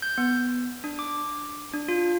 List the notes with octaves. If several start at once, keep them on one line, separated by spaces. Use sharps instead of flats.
G6
B3
D4
D6
D4
F4